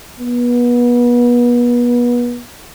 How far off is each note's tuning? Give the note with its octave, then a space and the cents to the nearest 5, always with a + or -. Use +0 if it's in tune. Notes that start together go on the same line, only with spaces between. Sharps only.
B3 -30